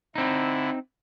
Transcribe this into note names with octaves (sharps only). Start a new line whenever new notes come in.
D3 C4 D#4 E4